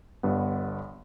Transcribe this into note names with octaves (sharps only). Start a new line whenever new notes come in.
G1 G2 B3